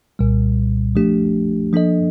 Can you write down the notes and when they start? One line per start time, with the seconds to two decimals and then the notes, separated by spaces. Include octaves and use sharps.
0.19 C2 A#2 G3
0.96 F3 A3 D4 G4
1.73 F3 A#3 D4 A4 D#5